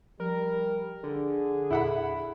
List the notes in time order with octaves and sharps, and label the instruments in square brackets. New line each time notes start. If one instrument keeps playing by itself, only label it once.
[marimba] F3 [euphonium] G3 [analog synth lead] A#4
[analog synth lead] D3 [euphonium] G#4
[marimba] E2 A#2 A4 [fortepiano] E4 F#5 B5